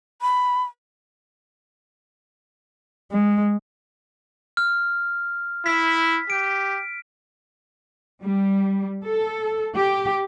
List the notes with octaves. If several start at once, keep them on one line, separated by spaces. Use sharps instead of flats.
B5
G#3
F6
E4 B6
G4 D7
G3
A4
G4